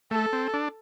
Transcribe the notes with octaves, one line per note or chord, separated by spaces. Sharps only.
A3 A4
C4
D4